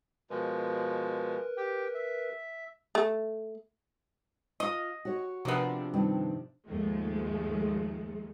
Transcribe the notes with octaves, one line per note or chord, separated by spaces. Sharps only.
B2 F3 G#3 A#4 B4
G4 G5
E5
A3
F4 D#5 F5
F#4 C#5
C3 F3 A#3 B3 D4
G2 D#3 C4
D#2 G#2 F3 G#3 A3